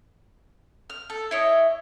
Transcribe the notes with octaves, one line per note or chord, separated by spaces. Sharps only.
F6
A4
E4 C#5 D#5